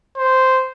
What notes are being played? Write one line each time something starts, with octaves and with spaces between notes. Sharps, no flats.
C5